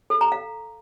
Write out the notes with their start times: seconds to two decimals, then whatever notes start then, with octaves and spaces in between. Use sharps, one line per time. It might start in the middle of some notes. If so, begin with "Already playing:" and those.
0.10 A4
0.21 A#5
0.32 F5